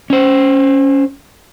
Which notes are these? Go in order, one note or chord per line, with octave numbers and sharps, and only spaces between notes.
C#4 C5